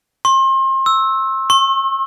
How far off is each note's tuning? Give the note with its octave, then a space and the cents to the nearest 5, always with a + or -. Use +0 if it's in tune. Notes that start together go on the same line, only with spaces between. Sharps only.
C6 +35
E6 -5
C#6 -45